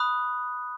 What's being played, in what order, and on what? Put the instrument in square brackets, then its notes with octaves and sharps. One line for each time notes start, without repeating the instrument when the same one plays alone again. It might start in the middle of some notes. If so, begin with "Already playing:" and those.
Already playing: [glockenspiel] B5 D#6 F#6